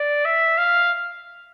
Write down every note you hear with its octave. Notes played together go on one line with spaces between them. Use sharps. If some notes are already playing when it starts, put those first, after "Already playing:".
Already playing: D5
E5
F5